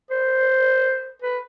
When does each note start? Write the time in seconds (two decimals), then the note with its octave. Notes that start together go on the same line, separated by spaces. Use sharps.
0.11 C5
1.22 B4